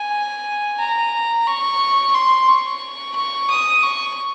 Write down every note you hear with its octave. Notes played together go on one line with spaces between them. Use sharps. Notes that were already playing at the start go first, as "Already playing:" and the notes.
Already playing: G#5
A#5
C#6
C6
C#6
C#6
D#6
C#6